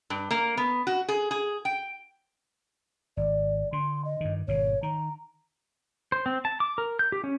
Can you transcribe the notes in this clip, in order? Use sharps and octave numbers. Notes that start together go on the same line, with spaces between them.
G2
A#3
B3
F#4
G#4
G#4
G5
G#1 D5
D3 C6
D#5
G2 D#3
G#1 B2 D#3 C#5
D#3 A#5
C5
C4
A5
D6
A#4
G6
G4
C#4